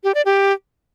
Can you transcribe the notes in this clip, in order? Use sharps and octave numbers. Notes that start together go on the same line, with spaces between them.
G4
D5
G4